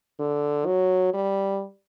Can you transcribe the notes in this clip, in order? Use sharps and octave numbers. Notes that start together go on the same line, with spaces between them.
D3
F#3
G3